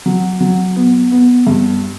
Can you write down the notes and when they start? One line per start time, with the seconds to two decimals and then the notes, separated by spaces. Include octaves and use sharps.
0.06 F#3
0.40 F#3
0.76 B3
1.12 B3
1.47 G2